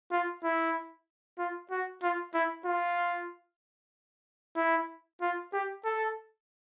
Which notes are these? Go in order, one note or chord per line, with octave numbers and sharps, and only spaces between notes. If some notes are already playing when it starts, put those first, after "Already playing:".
F4
E4
F4
F#4
F4
E4
F4
E4
F4
G4
A4